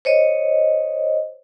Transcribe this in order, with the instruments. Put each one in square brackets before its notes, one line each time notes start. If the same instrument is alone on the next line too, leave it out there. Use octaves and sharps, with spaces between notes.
[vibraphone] C5 C#5 D#5